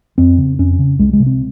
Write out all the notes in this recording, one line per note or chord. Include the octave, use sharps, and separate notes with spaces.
F2 C4
C#3
F2 C#4
C#3
C2 G#3
G#3
C3
C4